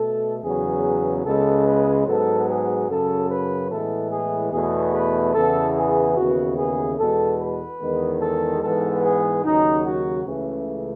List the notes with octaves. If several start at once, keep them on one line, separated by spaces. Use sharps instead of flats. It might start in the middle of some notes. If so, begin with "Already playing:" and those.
Already playing: B2 A3 A4
E2 C#3 F#3 B3 G#4
C#2 C#3 G#3 B3 A4
B4
G#2 F#3 B3 A4
G#4
F#2 C#3 F#3 A4
B4
A2 E3 G#3 B3 A4
G#4
E2 B2 A3 G#4
B4
E2 C#3 E3 B3 A4
G#4
D#2 C#3 E3 B3 F#4
G#4
E2 B2 G#3 B3 A4
B4
E2 D#3 G#3 B3
A4
G#2 E3 G#3 B3 A4
G#4
D#2 C#3 F#3 D#4
F#4
C#2 C#3 E3 A3 C#4